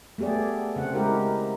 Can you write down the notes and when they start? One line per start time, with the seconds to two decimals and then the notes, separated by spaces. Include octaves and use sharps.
0.18 A3 B3 G4 G#4 D5
0.76 C#3 C4 F#5
0.94 G#3 E4 G4 A#4